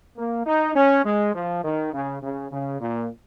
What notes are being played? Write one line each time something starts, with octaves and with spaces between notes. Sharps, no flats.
A#3
D#4
C#4
G#3
F3
D#3
C#3
C#3
C#3
A#2